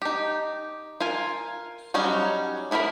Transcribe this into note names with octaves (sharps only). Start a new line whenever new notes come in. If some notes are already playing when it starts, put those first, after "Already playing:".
D#4 G4
F4 A#4 G#5
F#3 G3 C#4 D#4 F#4
B3 E4 A#4 G#5 B5